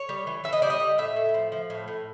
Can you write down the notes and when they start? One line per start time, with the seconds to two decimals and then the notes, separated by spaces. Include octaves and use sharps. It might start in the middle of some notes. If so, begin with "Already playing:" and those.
Already playing: C#5
0.09 G3
0.27 E3
0.44 E3 E5
0.53 D#5
0.62 G3 D5
0.70 D#5
0.80 G3
0.98 A2 E5
1.16 A2
1.34 F3
1.52 F3
1.70 A2
1.88 A2